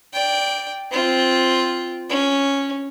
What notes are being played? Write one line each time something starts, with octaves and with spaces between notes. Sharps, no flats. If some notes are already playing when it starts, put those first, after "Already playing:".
D5 G5
C4 F4
C#4